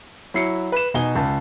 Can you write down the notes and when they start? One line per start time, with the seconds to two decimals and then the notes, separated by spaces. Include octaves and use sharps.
0.34 F#3 E4 C7 C#7
0.72 B4 E7
0.94 B2 D#4 G#5 G7
1.15 C#2 A5